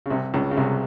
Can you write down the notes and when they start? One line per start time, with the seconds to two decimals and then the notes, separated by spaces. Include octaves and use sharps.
0.06 C#3
0.10 C2 C3
0.34 C#2 C#3
0.51 C#3
0.57 C2 C3